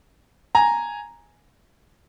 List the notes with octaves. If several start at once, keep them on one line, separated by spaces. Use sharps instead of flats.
G#5 A#5